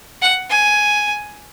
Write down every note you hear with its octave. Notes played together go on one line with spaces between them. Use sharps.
F#5
G#5